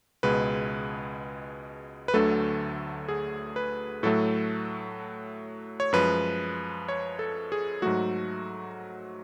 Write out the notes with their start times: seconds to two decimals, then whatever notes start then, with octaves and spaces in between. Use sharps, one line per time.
0.23 C#2 B2 G#3 B4
2.08 B4
2.14 D2 D3 F#3 A3 A4
3.08 G#4
3.56 B4
4.03 A2 F#3 A3 A4
5.80 C#5
5.93 F#2 F3 G#3 B4
6.88 C#5
7.19 A4
7.52 G#4
7.82 G#2 F#3 A3 F#4